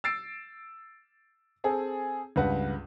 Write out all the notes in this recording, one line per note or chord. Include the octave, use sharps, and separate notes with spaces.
E6 A6 C7 D7
C4 G#4 A4
C#2 G2 B4 F#5